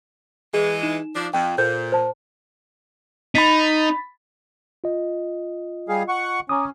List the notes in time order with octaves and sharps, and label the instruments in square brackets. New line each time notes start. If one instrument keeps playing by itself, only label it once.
[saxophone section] E3 G#3 [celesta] G#4
[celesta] D#4 E7
[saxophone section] F3 D4
[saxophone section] F2 [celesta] G5
[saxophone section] A#2 [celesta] A4 C5 G6
[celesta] C5 A5
[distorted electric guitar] D#4 [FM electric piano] B5 A6 B6
[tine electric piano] F4 D#5
[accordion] G3 G#4 F5
F#5 C#6
[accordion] C#4 [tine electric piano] A#5 D6 D#6